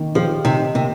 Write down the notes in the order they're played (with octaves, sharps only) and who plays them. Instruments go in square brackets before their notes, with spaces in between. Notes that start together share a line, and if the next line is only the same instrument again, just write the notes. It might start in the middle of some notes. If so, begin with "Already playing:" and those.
Already playing: [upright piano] D#3 A#3
[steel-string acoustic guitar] F3 [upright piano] G4
[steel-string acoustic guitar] C3 [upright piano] D#4
[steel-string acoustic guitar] C3 [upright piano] A#3